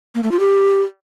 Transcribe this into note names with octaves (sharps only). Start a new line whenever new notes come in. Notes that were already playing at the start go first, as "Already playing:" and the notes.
A#3
A3
F4
G4